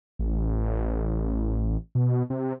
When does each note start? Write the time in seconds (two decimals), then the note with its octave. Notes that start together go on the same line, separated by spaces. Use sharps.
0.19 A1
1.95 B2
2.30 C3